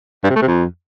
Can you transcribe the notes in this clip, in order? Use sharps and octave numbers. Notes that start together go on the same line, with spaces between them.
G2
C3
A3
C3
F2